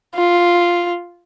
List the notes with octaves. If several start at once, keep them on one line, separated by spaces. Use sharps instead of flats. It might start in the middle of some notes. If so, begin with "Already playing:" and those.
F4